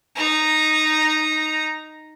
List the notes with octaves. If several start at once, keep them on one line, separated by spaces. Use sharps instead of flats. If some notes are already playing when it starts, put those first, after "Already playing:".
D#4 A#5